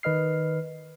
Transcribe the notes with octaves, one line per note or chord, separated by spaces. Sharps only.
D#3 B4 D#5 F6 C7